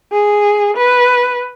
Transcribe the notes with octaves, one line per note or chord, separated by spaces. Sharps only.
G#4
B4